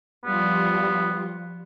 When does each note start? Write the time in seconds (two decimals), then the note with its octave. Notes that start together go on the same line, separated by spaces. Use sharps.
0.25 F3 G3 B3 F4